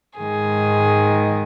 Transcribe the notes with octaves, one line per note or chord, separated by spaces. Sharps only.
G#2 D#3 G#3 G#4